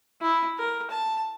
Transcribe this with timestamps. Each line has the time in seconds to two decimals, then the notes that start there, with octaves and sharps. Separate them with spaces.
0.21 E4
0.58 A#4
0.91 A5